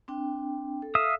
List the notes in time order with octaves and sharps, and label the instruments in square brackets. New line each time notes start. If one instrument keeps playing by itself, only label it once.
[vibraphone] C4 D4 G5
A4
[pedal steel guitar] E5 F5 D#6